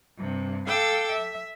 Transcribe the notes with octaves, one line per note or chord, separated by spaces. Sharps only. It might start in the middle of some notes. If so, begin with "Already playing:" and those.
G2 C3
A4 F5 G5 D6 E6
E5